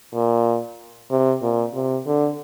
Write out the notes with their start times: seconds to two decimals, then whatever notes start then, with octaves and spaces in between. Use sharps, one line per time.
0.14 A#2
1.11 C3
1.42 A#2
1.74 C3
2.06 D3